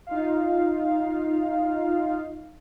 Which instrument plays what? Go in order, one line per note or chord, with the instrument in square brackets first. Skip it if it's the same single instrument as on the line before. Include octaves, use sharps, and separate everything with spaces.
[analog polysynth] D#4 F4 F5